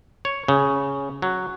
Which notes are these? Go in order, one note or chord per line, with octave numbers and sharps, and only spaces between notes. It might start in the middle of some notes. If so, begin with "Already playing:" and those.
C#5
C#3
F#3